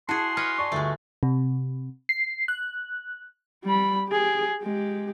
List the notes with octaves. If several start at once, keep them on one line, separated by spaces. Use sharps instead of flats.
E4 F#4 G#4 A5 C6
B4 C#5 D#5 F6
D5 A5 C#6
G1 D2 G#3 A3
C3
C7
F#6
G3 B5
G4 G#4
G#3 G4